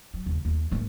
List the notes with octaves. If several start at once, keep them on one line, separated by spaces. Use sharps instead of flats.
F#3
D#2 C#3
D#2
G#2 A#3